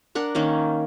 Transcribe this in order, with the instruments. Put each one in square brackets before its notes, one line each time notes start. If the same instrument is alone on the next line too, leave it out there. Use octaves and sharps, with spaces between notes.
[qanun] D4 A#4 F#5
D#3 A#3 C#4